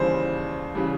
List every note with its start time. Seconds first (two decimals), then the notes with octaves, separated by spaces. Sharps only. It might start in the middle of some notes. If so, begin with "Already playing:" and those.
Already playing: D#2 C#3 E3 G3 C5
0.75 C#3 E3 G3